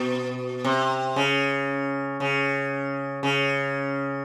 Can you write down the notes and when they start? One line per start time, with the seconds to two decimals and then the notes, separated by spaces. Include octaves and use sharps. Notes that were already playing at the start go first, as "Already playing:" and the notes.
Already playing: B2
0.64 C3
1.16 C#3
2.20 C#3
3.23 C#3